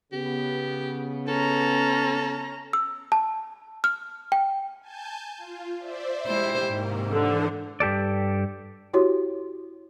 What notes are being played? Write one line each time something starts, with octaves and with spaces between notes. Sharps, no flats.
C#3 B3 G4
C#4 A4 A#5
E6
A5
F6
G5
G#5 A5 G6
F4
C5 D5 E5
G#3 E4 G4 C5
G#2 C3 D#3 A#3
D3 E3 C5
G2 G4 A4 D5
E4 F#4 G4 C#5 C6